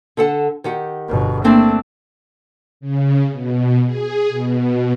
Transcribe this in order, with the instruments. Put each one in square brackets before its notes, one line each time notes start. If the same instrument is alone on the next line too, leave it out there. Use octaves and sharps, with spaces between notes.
[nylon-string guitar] D3 A4 F#5
D#3 G4 F#5
[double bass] G1 B2
[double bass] A3 [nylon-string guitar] A#3 C4 D4
[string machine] C#3
B2
G#4
B2